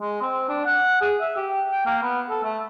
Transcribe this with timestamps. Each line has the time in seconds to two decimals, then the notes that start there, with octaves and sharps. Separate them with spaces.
0.01 G#3
0.22 C4
0.49 D4
0.65 F#5
1.01 G#4
1.21 E5
1.36 G4
1.71 G5
1.86 A#3
2.02 B3
2.30 A4
2.44 A3